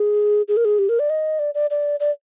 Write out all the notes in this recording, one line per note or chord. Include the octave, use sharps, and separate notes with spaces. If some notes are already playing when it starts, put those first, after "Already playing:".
Already playing: G#4
G#4
A#4
G#4
G4
A#4
D5
D#5
D5
D5
D5
D5